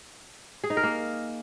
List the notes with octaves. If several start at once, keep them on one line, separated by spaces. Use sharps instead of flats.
G#4
D#4
A#4
A#3